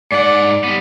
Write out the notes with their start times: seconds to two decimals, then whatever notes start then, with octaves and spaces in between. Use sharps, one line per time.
0.12 G#2 D5 F#5
0.64 G3 B3